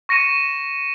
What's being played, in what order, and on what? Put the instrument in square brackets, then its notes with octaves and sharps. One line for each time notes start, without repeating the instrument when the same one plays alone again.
[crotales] C#6 A#6 C#7 D#7 E7